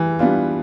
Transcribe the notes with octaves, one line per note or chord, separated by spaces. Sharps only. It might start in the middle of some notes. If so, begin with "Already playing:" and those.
Already playing: E3 G3
G3 B3 D4 F4